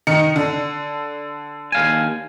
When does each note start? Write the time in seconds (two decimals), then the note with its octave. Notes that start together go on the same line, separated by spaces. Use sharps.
0.07 D#3 D#4 C#7
0.36 D3
1.72 D#2 F5 G#5